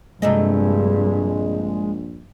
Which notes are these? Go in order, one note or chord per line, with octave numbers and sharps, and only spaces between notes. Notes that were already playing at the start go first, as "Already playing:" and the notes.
A#1 G2 C3 G#3 A3 D#5